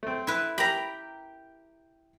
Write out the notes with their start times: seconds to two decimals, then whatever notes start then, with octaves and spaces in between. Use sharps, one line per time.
0.03 A3 C4
0.27 E4 B4
0.58 G4 A#4 G5 A#5 B5